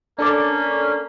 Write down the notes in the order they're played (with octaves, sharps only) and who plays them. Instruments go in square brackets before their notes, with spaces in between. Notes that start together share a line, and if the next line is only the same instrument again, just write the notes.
[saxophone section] A#3 C#4 [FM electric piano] D4 A4 D5